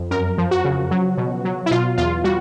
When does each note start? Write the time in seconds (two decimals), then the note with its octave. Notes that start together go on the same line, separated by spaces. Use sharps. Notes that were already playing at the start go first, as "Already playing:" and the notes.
Already playing: F2
0.11 F#2 A#4
0.38 F3
0.51 F#4
0.65 C#3
0.91 F#3
1.17 B2
1.45 F#3
1.66 E4
1.71 B2 F4
1.98 E2 F4
2.24 G3 F#4